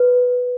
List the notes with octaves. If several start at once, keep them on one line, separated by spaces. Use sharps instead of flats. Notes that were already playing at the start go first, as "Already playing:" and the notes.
Already playing: B4